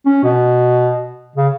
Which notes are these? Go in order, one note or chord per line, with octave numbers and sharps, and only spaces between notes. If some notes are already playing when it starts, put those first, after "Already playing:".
C#4
B2
C#3